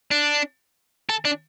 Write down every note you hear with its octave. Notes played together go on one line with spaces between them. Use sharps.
D4
A4
D4